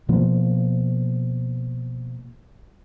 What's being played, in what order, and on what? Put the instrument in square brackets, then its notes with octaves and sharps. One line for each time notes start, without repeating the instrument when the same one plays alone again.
[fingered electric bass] B2 F3 A#3